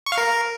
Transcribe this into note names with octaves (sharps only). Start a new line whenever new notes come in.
C#6
F5
A#4